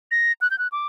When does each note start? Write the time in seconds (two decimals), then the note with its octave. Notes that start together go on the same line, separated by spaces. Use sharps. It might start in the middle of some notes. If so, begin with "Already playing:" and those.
0.11 A#6
0.41 F#6
0.51 G6
0.58 F#6
0.72 D6